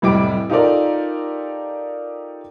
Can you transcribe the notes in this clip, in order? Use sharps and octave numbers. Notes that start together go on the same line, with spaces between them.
F1 A2 G3 D6 D7
D#4 F4 G4 A4 A#4 D5